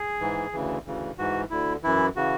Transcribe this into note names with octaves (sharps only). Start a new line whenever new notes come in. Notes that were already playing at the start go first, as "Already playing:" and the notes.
Already playing: G#4
G#2 E3
D2 C#3 E3
D2 C#3 E3
G#2 E3 F#4
D2 D3 E4
F#2 E3 E4
C#3 E3 F#4